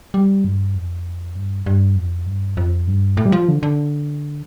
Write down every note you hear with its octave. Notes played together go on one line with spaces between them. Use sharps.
G3
G2
F2
G2
G2
F2
G2
F2
G2
A2
G3
F3
D3
D3